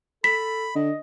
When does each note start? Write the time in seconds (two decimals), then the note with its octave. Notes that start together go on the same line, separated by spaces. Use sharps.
0.24 A4 B5 B6
0.75 D3 D#5